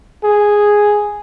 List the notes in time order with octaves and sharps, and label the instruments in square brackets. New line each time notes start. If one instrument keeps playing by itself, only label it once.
[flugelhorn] G#4